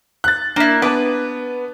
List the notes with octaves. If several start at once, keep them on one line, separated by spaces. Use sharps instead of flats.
F#6 A6
A#3 D4 E4
B3 B4 A5 D6